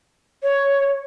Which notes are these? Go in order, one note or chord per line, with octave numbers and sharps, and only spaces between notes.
C#5